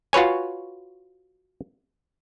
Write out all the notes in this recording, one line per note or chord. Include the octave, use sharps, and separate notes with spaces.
F4 F#4 B4 C#5 G#5